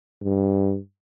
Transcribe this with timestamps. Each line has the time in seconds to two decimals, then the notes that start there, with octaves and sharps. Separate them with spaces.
0.22 G2